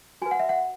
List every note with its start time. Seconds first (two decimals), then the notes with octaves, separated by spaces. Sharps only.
0.22 F#4 B4 G#5
0.31 F#5
0.40 E5
0.49 F#5